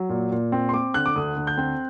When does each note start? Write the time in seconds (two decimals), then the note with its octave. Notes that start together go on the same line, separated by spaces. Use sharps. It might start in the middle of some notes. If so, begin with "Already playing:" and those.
Already playing: F#3
0.09 A#2
0.32 A#2
0.52 C4
0.69 C6
0.73 C4 D6
0.94 D3 F#6
1.06 D6
1.16 D2 D#6
1.36 D2
1.47 G6
1.57 C4